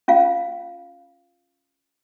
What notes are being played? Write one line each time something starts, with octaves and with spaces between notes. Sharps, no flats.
C#4 F4 F5